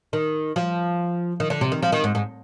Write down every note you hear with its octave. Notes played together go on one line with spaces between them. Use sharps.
D#3
F3
D#3
D3
C3
D#3
F3
D#3
G#2
G#2